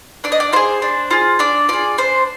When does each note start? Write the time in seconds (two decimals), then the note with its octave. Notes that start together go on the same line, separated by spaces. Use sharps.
0.24 D4 D5
0.32 D#5
0.40 D5
0.53 F4 G#4 C5
0.82 D4
1.11 F4 G#4
1.39 D4 D5
1.69 F4 G#4 D5
1.98 D4 C5